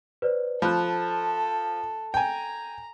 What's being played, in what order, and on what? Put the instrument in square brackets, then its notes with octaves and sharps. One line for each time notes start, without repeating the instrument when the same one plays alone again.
[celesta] B4 C5 D5
[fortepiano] F3 [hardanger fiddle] A4 [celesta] B5 F#6
[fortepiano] G5 G#5 [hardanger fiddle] A#5